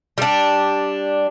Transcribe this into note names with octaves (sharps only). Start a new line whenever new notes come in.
G3 D4